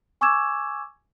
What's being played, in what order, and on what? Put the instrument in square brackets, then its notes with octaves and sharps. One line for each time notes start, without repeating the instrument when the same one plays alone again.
[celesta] G#5 C#6 D6 E6 G#6 E7